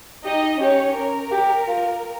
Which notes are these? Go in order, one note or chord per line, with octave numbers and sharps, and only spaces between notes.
D#4 G4 D#5
C#4 G4 C#5
A#4
G4
F4